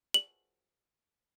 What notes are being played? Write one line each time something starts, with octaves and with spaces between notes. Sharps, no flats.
F#7